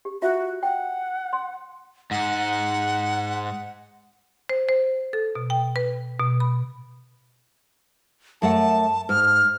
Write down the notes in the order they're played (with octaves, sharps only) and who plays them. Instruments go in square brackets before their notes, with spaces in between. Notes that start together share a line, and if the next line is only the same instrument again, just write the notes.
[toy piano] G4
[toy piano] F4 E5 [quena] F#4
[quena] F#5 [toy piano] G5
[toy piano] C6
[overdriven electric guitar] G#2 [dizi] F#5
[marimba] C5
C5
A4
B2
G5
B4
B2
B5
[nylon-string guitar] F#2 A3 F#5 [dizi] A5
[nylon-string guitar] G#2 [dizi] F6